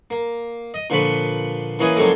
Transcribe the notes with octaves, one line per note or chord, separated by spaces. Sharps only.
A#3
D#5
A#2 D3 F3 B4 B5 C#6
E3 A#3 C#4 G#4 B4 D#5
C#3 F3 F#3 G#3 A#3 A4